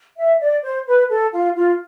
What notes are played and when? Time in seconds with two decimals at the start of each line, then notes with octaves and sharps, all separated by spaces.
0.17 E5
0.39 D5
0.62 C5
0.86 B4
1.09 A4
1.32 F4
1.54 F4